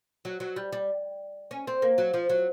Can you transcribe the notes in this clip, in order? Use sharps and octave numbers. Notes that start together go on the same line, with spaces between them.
F#3
F#3
G3
G3
C#4
C4
A#3
F#3
F3
F#3